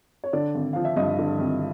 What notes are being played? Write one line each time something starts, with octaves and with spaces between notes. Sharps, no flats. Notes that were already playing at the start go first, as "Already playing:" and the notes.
C#5
D3 D5
G#1
F3 F5
E5
G2 D#5
D3
G#1